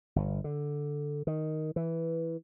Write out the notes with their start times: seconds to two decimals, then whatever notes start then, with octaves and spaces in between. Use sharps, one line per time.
0.16 G1
0.44 D3
1.27 D#3
1.76 E3